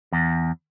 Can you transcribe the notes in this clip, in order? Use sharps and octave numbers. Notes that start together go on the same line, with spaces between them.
E2